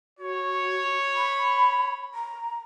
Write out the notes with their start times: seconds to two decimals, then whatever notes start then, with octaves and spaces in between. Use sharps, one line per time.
0.19 F#4 C#5
1.16 B5
2.15 A#5